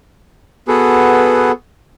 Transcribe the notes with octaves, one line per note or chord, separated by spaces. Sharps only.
B3 F#4 G#4 A4 B4